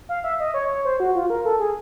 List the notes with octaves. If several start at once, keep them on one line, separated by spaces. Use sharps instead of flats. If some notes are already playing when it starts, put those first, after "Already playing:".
F5
E5
D#5
C#5
C#5
C5
F#4
F4
A#4
A4
G#4